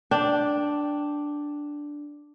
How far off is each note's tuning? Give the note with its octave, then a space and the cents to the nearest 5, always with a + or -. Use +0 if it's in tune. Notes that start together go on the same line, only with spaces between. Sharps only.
D4 +0 G5 +0